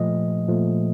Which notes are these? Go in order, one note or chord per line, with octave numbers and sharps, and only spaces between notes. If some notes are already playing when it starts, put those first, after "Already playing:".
Already playing: A#2 F3 A3 D#5
A#2 F3 A3